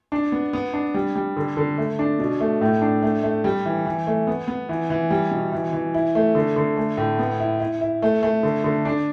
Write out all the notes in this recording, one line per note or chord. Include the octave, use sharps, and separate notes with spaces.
D4
B3
B3
D4
G3
G3
D3
D3
A3
D4
B2
A3
A2
D4
A3
A3
G3
E3
E3
A3
B3
B3
E3
E3
G3
B2
E3
E3
E4
A3
D3
D3
A3
A2
B3
E4
E4
E4
A3
A3
D3
D3
D4